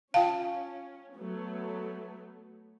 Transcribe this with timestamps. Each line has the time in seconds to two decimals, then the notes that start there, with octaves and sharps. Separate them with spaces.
0.14 C#4 F4 F5 G5 A5
1.16 F#3 A3 B3